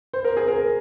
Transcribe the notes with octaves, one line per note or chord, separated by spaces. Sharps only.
C5
A#4
G#4
A#4